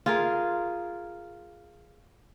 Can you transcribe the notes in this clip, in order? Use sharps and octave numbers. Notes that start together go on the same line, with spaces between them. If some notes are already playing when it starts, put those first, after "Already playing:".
F4 G#4 A#4